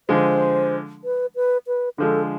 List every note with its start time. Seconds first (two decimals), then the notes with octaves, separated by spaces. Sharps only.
0.09 D3 F3 G#3 C5
1.04 B4
1.36 B4
1.67 B4
1.98 D3 F3 G#3 A4